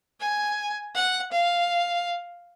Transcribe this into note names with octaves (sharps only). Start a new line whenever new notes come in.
G#5
F#5
F5